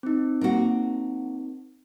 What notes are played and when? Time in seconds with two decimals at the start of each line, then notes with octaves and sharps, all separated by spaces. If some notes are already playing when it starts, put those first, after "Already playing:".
0.03 C4 D#4
0.41 A#3 F#4